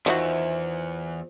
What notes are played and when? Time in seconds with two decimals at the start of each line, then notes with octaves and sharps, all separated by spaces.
0.06 E2 D#3 D4 F4 F#4 C5 E5